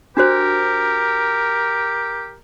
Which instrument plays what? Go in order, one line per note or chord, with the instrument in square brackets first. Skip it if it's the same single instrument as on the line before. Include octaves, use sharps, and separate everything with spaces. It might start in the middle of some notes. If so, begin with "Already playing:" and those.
[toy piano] D4 F#4 C5 [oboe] G4 [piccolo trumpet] A#4